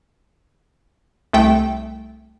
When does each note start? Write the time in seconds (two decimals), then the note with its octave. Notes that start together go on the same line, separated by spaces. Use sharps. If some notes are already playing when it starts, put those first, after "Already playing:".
1.33 C2 A3 G5